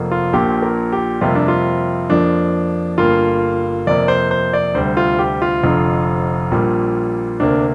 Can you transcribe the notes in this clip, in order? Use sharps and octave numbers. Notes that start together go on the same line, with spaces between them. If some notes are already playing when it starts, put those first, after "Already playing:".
Already playing: F1 F2 F3 A#3
F4
A#1 A#2 A#3 G4
A#4
G4
F2 C3 G3 A#3 F4
D4
F4
F2 F3 A#3 D4
G1 G2 G3 A#3 F4
F2 C3 A#3 D5
C5
C5
D5
D2 C3 G3 C5
F4
G4
F4
F1 F2 D3 F3
A#1 A#2 G3 A#3
D2 C3 A#3 D4